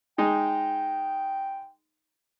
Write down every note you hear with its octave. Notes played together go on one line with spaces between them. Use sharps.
G#3 D#4 G5